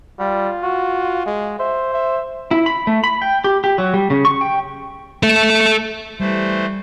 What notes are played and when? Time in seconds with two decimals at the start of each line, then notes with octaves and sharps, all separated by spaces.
0.20 G3 F4
0.63 F#4
1.26 G#3
1.60 C5 E5
1.93 E5
2.51 E4
2.66 B5
2.87 A3
3.04 B5
3.22 G5
3.44 G4
3.64 G4
3.78 F#3
3.94 G3
4.10 C#3
4.25 C#6
4.41 G5
5.23 A4 E5
6.20 E3 G3 A3 C5